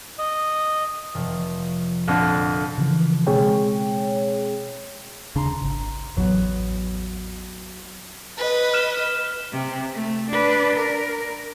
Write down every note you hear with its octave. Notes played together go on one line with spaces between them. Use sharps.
D#5
F1 F3
F2 A#2 D3 A4
C#3 E3 F3
B2 G#3 C4 G#4 C#5 G5
D#1 C#3 D4 A#5 C6 A#6
G#1
A1 E2 F#3 B3
B4 D#5
F6 E7
C3
A3
D4 B4
A#4